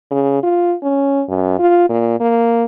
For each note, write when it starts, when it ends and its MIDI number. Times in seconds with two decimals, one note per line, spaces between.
0.11 0.42 49
0.43 0.75 65
0.83 1.22 61
1.29 1.58 42
1.59 1.85 65
1.89 2.20 46
2.20 2.64 58